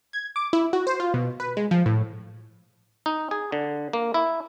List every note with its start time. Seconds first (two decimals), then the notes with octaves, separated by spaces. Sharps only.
0.13 G#6
0.36 D6
0.53 E4
0.73 F#4
0.87 C5
1.00 F4
1.14 B2
1.40 B4
1.57 G#3
1.71 F3
1.86 A2
3.06 D#4
3.31 G#4
3.52 D3
3.93 A#3
4.14 E4